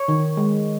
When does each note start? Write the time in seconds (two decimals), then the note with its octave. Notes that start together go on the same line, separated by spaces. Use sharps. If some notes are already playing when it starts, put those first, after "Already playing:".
Already playing: C#5
0.08 D#3
0.37 G#3